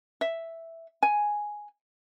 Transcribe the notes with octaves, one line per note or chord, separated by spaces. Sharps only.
E5
G#5